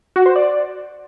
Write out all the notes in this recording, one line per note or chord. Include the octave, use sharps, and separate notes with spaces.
F#4
C5
D5